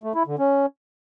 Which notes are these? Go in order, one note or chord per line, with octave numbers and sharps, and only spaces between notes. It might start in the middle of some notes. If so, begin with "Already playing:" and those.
A3
E4
D3
C#4